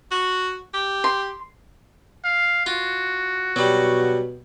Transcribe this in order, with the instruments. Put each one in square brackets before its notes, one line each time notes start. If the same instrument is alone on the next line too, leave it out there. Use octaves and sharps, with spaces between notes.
[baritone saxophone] F#4
G4
[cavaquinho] C6
[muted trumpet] F5
[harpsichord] F4 [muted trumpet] F#4
[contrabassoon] B2 [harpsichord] F#3 G3